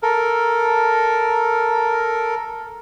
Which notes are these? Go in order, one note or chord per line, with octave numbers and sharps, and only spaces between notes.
A4 A#4